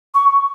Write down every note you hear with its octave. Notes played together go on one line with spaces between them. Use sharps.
C#6